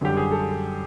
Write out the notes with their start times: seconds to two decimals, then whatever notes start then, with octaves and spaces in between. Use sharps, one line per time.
0.01 F#2 D3 G3 G4
0.17 G#4
0.32 A4